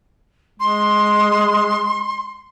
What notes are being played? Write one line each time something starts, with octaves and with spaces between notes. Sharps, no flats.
G#3 C6